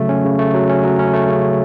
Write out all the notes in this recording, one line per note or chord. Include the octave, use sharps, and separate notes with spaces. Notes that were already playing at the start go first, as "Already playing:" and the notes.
Already playing: C#3 F#3 A3
C#4
C#3
A3
F#3
C#4
F#3
C#4
A3
C#3